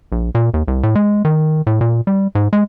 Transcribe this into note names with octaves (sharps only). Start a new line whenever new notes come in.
A#1
A#2
D#2
C2
A2
G#3
D#3
A2
A#2
G3
G#2
G#3